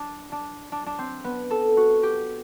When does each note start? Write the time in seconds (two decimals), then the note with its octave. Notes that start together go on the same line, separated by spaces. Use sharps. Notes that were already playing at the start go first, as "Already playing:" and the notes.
Already playing: D4
0.32 D4
0.72 D4
0.86 D4
0.99 C4
1.24 B3
1.51 A4
1.77 F#4
2.03 G4